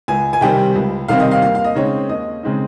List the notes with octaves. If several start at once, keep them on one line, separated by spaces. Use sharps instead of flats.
C#2 G#5
G#5
C3 D#3 G3 C4 G5
C#2
C3 D#3 G3 C4 F5
D#5
F5
D#2 F5
F5
D#5
C#3 G#3 C4 D#4 C#5
D#2 D#5
C#3 G#3 C4 D#4